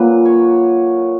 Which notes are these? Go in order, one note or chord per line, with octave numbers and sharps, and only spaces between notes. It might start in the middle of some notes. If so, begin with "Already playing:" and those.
Already playing: A#2 F#3 A#3 B4
C#5